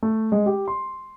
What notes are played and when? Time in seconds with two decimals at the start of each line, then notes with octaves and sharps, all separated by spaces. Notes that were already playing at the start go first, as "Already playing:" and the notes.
0.03 A3
0.32 G#3
0.46 G4
0.68 C6